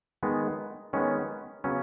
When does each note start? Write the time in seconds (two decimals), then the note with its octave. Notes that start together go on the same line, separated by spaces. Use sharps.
0.23 D#3 G#3 B3
0.93 D#3 G#3 B3 C#4
1.64 C#3 F#3 B3 C#4